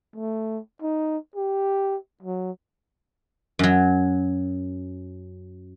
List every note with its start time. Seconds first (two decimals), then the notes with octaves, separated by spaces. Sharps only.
0.16 A3
0.82 D#4
1.36 G4
2.23 F#3
3.59 F#2 F#3